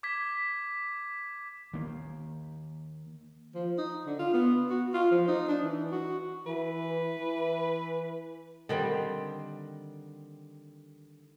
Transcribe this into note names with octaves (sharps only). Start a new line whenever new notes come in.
D6 G#6 B6
D#3 A#3
F3
D#4
D3
F4
B3
F#4
F4
F3
D#4
D4
E3
F#4
E3 B4
E3
D3 D#3 G3 C4